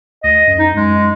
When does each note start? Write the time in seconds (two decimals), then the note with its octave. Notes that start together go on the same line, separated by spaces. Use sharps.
0.24 D2 D#5
0.47 F#2
0.59 D#4
0.76 F#2 G#3